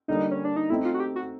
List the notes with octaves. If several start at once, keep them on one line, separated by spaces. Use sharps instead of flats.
D3 G3 A#3 D#4
C#4
D4
D#4
A3 C4 D#4 E4
F4
F#4
G4
F#4